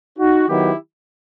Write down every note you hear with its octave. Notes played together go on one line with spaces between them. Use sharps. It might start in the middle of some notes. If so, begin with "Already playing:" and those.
D#4 F#4
D#3 F#3 B3 E4 G4